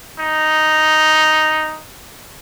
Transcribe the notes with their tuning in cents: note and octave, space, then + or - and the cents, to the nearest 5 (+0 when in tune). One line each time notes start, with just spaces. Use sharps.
D#4 +0